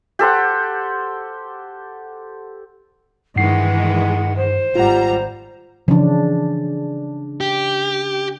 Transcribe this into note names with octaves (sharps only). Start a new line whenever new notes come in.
G4 A4 C5 F#5
G2 D#3 E3 G#3 F#5 C7
C5
G#1 G3 F4 F#5 A#5
C#3 E3 F3 D4
G4